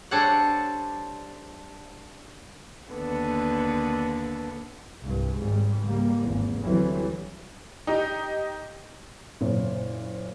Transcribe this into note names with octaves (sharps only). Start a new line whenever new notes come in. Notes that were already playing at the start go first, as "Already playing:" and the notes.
G3 D4 A4 C5 C#5 F#5
D#2 D3 B3
C2 G2
G#1 G#2 G3
C#2 G3 A#3
G#1 E2
D2 D3 E3 F#3 G3 C4
D#4 G4
F#1 A#2 C5 C#5